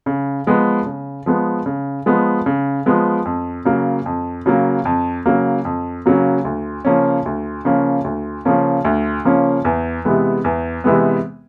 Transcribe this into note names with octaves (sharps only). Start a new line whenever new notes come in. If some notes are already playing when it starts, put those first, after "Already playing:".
C#3
F3 G#3 B3
C#3
F3 G#3 B3
C#3
F3 G#3 B3
C#3
F3 G#3 B3
F2
C#3 F#3 A#3
F2
C#3 F#3 A#3
F2
C#3 F#3 A#3
F2
C#3 F#3 A#3
D2
C#3 F3 A#3 C#4
D2
C#3 F3 A#3 C#4
D2
C#3 F3 A#3 C#4
D2
C#3 F3 A#3 C#4
E2
C3 E3 G#3 B3
E2
C3 E3 G#3 B3